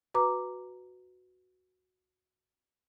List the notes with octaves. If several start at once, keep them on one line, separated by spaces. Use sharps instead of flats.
F#4 B4 A#5 D6